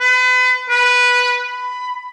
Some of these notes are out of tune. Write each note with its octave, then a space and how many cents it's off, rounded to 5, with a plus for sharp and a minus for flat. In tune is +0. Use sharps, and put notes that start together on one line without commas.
B4 +35
B4 -5
B5 +15